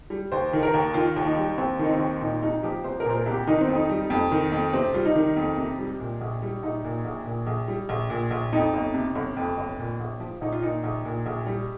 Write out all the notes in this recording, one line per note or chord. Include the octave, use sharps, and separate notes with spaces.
G3
D#2 C5
D#3
A#4
D#2
D#3 F4
D#2
D#4
G3
D#2 C4
D#3 D#4
C4
D#2
A#2 D#4
C2 D#4
F3 G4
C2 C5
A#4
A#2 C5
A#4
C2
G4
D#3 D#4
C4
F2
D#4
G3
F2
D#3
F2
C3 C4
G3 F4
D#4
D#3
F2
C3
G3
A#2
A#1
G3
A#1 D#4
A#2
A#1
A#2
A#1
G3
A#1
A#2
A#1
F2 D#4
G1
C3
G1
F2
G1
A#2
A#1
F3
A#1 D#4
F4
A#2 D#4
A#1
A#2
A#1
G3